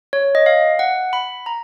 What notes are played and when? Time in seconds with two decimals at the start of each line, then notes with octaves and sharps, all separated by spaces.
0.13 C#5
0.35 D#5
0.46 F5
0.79 F#5
1.13 B5
1.46 A#5